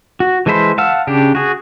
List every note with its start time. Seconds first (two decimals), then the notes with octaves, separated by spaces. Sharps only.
0.20 F#4
0.46 E3 G#3 A4 C5 B5
0.78 F5 F#5 A5 E6 F6
1.07 C#3 D4 G4
1.35 F#4 G#4